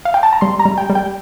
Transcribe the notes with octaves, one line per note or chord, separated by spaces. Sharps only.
F5
G5
A5
A#5
G3 C6
A#5
G3
G5
G3
G5